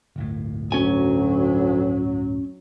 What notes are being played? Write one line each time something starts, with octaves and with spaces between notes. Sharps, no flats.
D1 G1 A2
D2 F#3 C#4 G#5